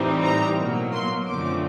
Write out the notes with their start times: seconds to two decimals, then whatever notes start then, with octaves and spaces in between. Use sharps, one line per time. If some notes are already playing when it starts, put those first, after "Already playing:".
Already playing: A2 E3 G3 C4 D#4
0.23 A#5
0.58 B2 F#3 A#3
0.93 C6
1.28 F#2 D3 F3 A3 C4 D6